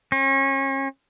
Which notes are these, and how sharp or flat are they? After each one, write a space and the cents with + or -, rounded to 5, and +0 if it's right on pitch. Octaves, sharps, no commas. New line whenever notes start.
C#4 -35